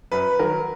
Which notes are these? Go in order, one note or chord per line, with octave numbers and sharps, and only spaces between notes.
F#2 B4
D#3 F#3 A#4